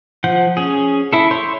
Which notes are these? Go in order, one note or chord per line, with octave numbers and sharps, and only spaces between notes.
F3 F#5 G6
C#4 G#4
E4 A4
C#5 C6 G6